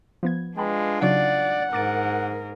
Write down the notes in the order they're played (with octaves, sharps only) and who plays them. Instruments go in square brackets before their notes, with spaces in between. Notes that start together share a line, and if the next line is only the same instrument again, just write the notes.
[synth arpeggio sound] F3 B3 G#6
[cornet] G#3 [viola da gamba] D4 F4 [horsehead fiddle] B4 [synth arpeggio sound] G5 A5 B5
[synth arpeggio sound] C#3 F#3 D#4 [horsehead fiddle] D5 [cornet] F#5
[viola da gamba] G#2 [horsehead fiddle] A#4 [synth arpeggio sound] D6 A6 D7